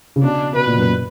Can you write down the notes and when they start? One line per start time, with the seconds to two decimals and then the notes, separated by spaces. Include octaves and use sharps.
0.16 C#3
0.22 B2 D4
0.55 B2 B4
0.67 A#2
0.78 F#2